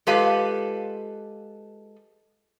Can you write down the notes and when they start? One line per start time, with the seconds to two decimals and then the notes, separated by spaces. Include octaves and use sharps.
0.07 G#3 F4 G4 A4 B4 F5